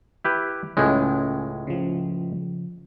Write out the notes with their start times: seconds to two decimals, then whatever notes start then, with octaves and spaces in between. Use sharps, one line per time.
0.24 E4 G4 B4
0.77 C#2 A2 G#3 C#4 G#5
1.67 C#3 F3